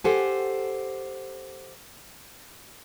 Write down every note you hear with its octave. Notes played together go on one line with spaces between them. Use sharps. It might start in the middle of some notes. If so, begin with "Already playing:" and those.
G4 A4 C5 F#5 G#5